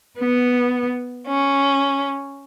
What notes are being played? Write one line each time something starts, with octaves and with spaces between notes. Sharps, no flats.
B3
C#4